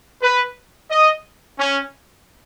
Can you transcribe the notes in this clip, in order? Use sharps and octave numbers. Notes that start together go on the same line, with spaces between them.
B4
D#5
C#4